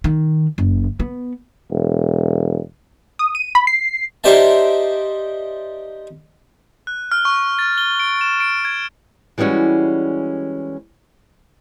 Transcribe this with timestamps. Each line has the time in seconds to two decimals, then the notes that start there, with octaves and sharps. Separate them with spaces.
0.04 D#3
0.58 F#1
1.00 B3
1.71 E1
3.19 D#6
3.35 D#7
3.55 B5
3.67 C7
4.24 D#4 G4 C5 D5 E5 A5
6.87 F#6
7.12 F6
7.25 C#6
7.59 A6
7.78 G7
8.00 D7
8.21 E7
8.40 D7
8.65 G#6
9.38 E3 G3 G#3 C#4 F#4